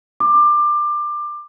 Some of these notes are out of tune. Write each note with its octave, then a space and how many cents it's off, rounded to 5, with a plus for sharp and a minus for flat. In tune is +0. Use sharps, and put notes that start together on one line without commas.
D6 +20